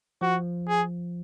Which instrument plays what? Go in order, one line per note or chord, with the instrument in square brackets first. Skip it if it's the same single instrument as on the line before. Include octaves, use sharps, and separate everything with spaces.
[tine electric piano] F3 [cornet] F#4
[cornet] G#4